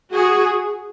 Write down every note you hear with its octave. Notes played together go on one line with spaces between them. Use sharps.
F#4 G#4